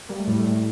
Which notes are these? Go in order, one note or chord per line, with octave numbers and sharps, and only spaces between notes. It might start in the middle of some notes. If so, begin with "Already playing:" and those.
G3 A#3
A3
A2 G3
A3
A2